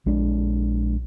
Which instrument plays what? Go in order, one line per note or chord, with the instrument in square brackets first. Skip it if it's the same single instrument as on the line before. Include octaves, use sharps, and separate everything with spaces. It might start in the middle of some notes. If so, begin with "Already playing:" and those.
[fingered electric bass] A#1 G#3 D4